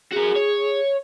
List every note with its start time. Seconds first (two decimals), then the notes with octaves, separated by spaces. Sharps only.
0.12 F#4 G#4 A#4
0.36 C#5